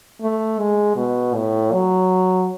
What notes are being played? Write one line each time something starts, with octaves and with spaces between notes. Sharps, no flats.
A3
G#3
B2
A2
F#3